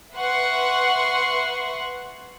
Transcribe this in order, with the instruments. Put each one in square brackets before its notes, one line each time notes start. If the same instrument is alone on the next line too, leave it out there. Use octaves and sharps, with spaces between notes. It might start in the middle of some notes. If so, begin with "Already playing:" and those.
[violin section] B4 E5 F#5 C6 C#6